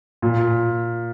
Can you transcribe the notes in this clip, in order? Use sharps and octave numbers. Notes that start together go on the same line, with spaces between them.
A#2